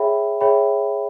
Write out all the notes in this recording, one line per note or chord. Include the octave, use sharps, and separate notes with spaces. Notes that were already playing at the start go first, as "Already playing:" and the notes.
Already playing: G#4 C#5 E5 G5 B5
G#4 C#5 E5 G5 B5